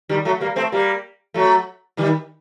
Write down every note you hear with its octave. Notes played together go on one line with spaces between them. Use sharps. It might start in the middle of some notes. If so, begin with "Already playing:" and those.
D#3 G3
F#3 A3
G3 A#3
A3 C4
G3 A#3
F#3 A3
D#3 G3